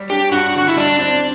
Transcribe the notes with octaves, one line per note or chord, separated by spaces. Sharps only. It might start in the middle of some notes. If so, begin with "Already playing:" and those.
Already playing: F#3 G3
D4 G4
G2 F#4
D3 F#4
E4
G3 D4
C4 D4